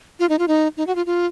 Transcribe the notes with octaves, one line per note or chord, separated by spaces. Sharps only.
F4
D#4
F4
D#4
D#4
F#4
F4
F4